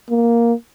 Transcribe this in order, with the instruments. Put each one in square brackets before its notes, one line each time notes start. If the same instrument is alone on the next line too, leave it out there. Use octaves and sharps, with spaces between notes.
[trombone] A#3